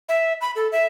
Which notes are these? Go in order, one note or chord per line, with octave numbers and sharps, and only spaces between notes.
E5
B5
A4
E5